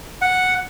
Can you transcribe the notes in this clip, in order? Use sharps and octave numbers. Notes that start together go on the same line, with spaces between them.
F#5